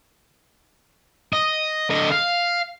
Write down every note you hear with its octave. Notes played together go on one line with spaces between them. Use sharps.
D#5
D3 D#5
F5